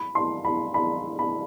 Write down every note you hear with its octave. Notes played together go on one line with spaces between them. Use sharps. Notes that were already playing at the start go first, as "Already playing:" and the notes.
Already playing: B5
C6
B5
B5
B5